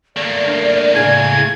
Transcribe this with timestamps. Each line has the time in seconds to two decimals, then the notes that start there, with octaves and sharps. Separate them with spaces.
0.17 A3 A#3 D5
0.46 D4 A#4
0.95 A2 C#3 G#5 G#6